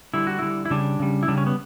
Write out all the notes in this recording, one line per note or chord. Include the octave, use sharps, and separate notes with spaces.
D3 G3 E4
F#4
D3 G3 E4
E4
C#3 G3 D4
C#3 G3
E4
C#3 G3 D4
C#4
B3